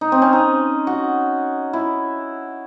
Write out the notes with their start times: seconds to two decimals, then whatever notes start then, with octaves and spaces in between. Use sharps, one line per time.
0.01 D#4
0.12 C4
0.22 C#4
0.33 D#4
0.87 F#4
1.73 E4